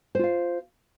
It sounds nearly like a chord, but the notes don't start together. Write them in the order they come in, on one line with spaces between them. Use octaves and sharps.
C5 F4 F5